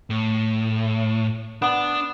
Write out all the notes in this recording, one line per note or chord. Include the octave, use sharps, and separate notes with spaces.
A2
B3 D4